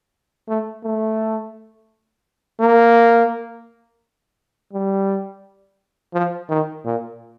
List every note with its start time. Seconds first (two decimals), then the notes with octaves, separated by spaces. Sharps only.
0.49 A3
0.84 A3
2.60 A#3
4.73 G3
6.14 F3
6.49 D#3
6.85 A#2